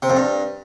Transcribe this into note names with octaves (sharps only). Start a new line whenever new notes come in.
C3
F2
G2